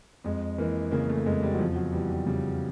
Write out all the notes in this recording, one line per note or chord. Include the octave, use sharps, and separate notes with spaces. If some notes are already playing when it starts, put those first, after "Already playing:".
F2 G#3
E3 A#3
C#3 A#3
A3
F2 G#3
G3
F#3
E2 F3
F#3
E3 G3
G3
C#3 G3